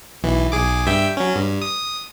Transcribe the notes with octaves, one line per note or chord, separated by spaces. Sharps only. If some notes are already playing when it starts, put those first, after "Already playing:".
B1 E3
B1 G#4 D6
G2 E5 G5
F#3 C#4
G2
D#6